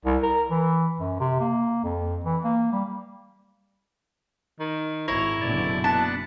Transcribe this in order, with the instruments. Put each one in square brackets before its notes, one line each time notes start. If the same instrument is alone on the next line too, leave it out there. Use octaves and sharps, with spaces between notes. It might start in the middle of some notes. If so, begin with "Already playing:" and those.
[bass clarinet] C2
A#4
E3
F#2
C3
A#3
F2
E3
A#3
G3
[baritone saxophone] D#3
[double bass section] G#1 [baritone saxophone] E4 [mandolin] C#5 [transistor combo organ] A#5
[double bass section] F#1 B2 D3 [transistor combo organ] D5
[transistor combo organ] B3 D4 [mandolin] A5